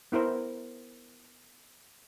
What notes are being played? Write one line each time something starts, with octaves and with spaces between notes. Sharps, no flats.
B3 E4 A#4 C5